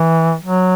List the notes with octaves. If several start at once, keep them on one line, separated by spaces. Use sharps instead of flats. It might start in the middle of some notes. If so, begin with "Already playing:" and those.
Already playing: E3
F#3